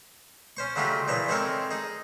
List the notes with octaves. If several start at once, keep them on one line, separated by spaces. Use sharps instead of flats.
C#4 C5 C#6
C#3 F#3 A3 D#4 F4 G4
A#2 E3 F3 C#5 A#5 C#6
G#3 C4 D#4 A4 A#4 C#5
D#4 G#4